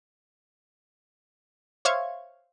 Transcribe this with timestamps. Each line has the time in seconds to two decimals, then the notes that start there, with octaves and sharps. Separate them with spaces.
1.85 C5 C#5 E5 F5 C#6 G#6